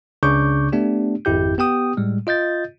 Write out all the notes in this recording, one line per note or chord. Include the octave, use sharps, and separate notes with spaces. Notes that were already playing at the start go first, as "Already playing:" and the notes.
C#2 C#3 D4 C#6 D6 G6
A3 B3 D4 G4
G#1 F2 E4 G4 G6
B3 G4 G5 D#6
A2 G3 G#3
F4 D#5 G6 A6